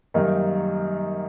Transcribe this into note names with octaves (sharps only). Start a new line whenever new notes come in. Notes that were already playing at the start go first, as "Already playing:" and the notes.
F#2 D#3 G3 A#3 D#4